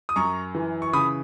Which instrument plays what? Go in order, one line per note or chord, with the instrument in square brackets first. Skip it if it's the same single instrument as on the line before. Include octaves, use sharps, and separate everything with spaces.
[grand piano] D#6
F#2 A#5 C#6
E3
C#6
C#3 B5 D#6